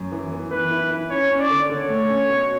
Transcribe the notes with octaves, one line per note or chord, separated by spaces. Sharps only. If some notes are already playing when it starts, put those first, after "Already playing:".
Already playing: F#2
E3
B3
E3 B4
E4
E4
C#4 C#5
C#4
D5
D3
D3 C#5
A3
C#4
B2